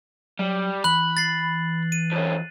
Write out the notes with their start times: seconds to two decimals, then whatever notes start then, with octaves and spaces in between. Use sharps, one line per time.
0.39 F#3 G3
0.84 E3 B5 F#6 F#7
1.17 A6 C7
1.92 D#7
2.12 F2 C#4